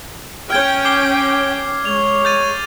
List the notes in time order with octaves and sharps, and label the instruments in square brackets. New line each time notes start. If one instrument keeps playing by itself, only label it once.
[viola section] C#4 G5 [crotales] F6 G#6 G7
[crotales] D6 C7 G7
[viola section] G#3 [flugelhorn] C#5 [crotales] F7
[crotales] G6 A6 D#7